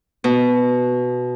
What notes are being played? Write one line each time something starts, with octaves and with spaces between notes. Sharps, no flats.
B2